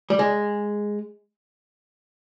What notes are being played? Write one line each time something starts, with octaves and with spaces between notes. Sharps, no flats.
G3
G#3